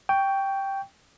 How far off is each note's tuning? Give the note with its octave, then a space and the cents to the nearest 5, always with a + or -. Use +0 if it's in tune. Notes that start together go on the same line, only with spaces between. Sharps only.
G5 +0 C#6 +20